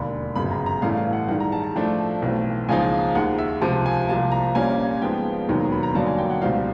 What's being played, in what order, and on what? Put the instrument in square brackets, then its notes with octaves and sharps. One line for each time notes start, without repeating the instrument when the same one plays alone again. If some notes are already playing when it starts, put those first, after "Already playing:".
Already playing: [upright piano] E1 D#2 D3 B5
G1 F#2 C#3 B5
A#5
A#5
A1 G2 E3 A3 F5
F5
F#5
G2 D#3 G#3 F#5
A#5
A5
A5
A2 F3 A3 D4
B1 A2 E3 A3 C4
C#2 C#3 F3 A#3 D#4 G#5
D#2 D#3 G#3 F#5
E5
C#2 C3 F3 A5
G#5
C2 C3 F3 A#3 A5
A#5
A#1 A#2 G3 A#3 C#4 G#5
G#2 F3 G#3 B3 G5
E1 D#2 D#3 F#3 B3
A#5
B5
A#5
G2 D3 F#3 A#3 D#4 A5
G#5
G5
F#5
C#2 B2 G3 C4 D#4 F5